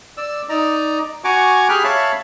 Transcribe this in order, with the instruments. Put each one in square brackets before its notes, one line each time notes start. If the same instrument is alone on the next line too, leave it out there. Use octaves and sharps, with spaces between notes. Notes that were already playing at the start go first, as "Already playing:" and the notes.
[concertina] D5 E6
D#4 D5 A#5
F#4 G#5 A#5 C#6 D6
G4 G#4 G5 B5 F6 F#6
C#5 E5 F5 A5 B5